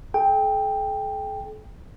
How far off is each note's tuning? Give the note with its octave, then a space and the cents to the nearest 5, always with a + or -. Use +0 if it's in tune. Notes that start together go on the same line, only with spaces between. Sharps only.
A4 -45 G5 +10